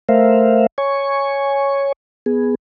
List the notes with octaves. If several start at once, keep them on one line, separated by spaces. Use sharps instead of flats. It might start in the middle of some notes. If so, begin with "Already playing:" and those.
A3 A#4 C5 E5 F5
C#5 G#5 C#6
B3 G#4